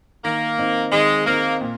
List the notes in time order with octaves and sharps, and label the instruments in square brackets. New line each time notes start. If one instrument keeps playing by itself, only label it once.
[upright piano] D#3 [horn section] A#3
[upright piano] C4 D#4
[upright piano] D#3 [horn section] G#3
[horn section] A#3 [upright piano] C4 D#4
[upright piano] A#2